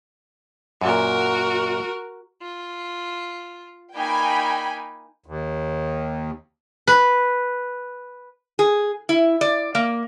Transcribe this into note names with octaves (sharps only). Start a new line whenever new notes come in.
F#2 A#2 F#4 A#4
F4
A#3 D#4 G5 G#5 B5
D#2
B4
G#4
E4
D5
A#3